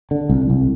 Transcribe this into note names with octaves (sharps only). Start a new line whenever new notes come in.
D3
C2
C2